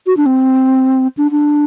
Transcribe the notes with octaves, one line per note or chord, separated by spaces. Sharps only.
F#4
D4
C4
D4
D4